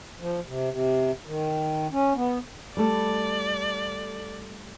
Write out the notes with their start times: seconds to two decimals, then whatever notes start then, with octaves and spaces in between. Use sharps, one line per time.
0.20 F3
0.46 C3
0.71 C3
1.26 D#3
1.92 C#4
2.15 B3
2.77 G3 A3 A4 D5